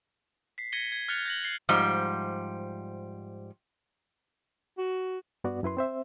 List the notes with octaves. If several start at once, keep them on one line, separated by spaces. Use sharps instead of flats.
B6 C7
G#6 A#6 B6 C#7 D#7 G7
G#6
F6 F#6 A6 C#7 F7
G6 A#6 F#7
A6 C7
G#2 F3 G3
F#4
G2 B3 F#4 D5
F#2 E4 B4 C6
C4 C5 E5